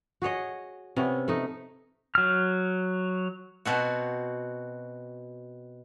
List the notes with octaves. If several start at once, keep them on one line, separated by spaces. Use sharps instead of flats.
F#4 G#4 C#5 D#5
C3 B3 C#4
A3 D#4
F#3 F6
B2 C4 F#4